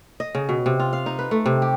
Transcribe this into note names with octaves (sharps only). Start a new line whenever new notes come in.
D#5
C#3
B2
C3
F4
F5
D#4
B4
A3
C3
G4